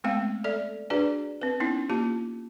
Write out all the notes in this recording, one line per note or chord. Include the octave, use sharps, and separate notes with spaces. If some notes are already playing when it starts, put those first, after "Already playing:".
G#3 A3 B3 C4 F5 G5
A4 D5 E5
D4 F#4 G#4 B4 D5
C4 B4
B3 C#4 D#4 E4
A#3 F4 G4 A5